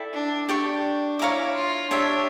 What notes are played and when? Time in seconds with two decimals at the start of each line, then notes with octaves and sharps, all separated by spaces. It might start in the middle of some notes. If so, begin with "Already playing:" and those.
Already playing: E4 A4 D5 G5
0.13 D4
0.49 D4 G4 D5 G5 C#6
1.19 E4 C#5 F5 A#5 D6
1.55 F4
1.91 D4 G4 C#5 E5